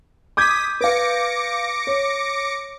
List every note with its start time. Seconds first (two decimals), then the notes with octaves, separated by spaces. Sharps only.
0.37 D6 D#6 G6 G#6 B6
0.81 B4 F5 D6 A#6 C#7
1.87 C#5